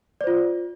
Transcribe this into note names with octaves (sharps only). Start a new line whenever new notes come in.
F4 C5 D5